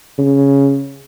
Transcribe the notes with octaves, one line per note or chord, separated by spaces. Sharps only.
C#3